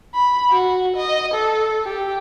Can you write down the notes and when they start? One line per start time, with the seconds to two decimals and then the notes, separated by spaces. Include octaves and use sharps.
0.14 B5
0.50 F#4
0.97 D#5
1.34 A4
1.85 G4